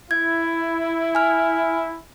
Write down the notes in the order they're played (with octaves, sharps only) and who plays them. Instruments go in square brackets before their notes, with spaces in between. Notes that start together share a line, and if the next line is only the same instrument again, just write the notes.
[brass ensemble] E4 [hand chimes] G#6
[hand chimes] G#5 F6